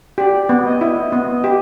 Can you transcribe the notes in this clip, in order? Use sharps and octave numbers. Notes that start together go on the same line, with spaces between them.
G4 D5
B3
D#5
E4
B3
G4